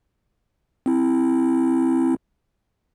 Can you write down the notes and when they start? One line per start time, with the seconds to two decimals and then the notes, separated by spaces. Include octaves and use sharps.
0.86 C4 E4